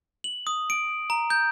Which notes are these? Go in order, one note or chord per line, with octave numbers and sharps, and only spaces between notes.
F#7
D#6
D7
A#5
G6